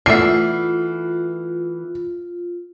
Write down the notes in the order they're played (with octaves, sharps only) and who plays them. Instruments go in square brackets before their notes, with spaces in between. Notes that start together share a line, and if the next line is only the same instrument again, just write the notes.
[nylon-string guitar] E3 A3 B3 [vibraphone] F4 [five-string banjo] D5 E5 [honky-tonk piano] C7